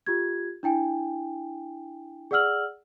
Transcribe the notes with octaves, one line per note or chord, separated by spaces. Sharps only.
F4 G4 G#6
D4 E4 G5 G#5
G#4 D5 F#5 E6 F6 F#7